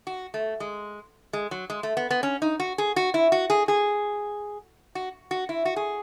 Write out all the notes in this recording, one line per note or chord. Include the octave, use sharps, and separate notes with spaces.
F#4
A3
G#3
G#3
F#3
G#3
A3
B3
B3
C#4
D#4
F#4
G#4
F#4
E4
F#4
G#4
G#4
F#4
F#4
E4
F#4
G#4